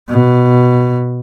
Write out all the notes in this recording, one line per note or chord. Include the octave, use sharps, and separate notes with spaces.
B2